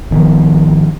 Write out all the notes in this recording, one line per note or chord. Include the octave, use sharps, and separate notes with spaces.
G#1 D#3 F3 B3